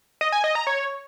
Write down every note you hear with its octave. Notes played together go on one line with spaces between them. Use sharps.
D#5
G#5
D#5
A#5
C#5